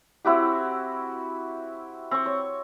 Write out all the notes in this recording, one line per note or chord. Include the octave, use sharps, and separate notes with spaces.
C4 E4 F#4 G4
C4 C#6
C#5